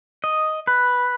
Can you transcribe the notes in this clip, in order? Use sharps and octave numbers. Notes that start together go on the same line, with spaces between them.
D#5
B4